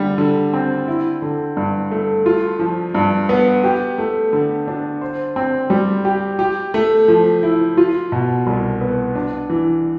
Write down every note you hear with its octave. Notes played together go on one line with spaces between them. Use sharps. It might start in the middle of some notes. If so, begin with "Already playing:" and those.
Already playing: D3 G3
D3
C4
E4
D3
G2
A3
F4
F3
G2
B3
G4
A3
D3
D4
C5
C4
G3
G4
G4
A3
F3
E4
F4
B2
C2
B3
D4
E3